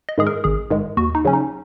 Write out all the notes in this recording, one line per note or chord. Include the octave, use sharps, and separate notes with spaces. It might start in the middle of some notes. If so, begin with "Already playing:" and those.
D#5
G#2 D#3 G#3 G#4
A#4
G#1 G#4
G#2 D#3 G#3
D#2 F#4
D#4
C#3 F#3 C#4
D#4